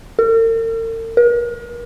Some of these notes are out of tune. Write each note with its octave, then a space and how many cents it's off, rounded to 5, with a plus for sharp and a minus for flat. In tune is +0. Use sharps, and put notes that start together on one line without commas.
A#4 -45
A#4 +40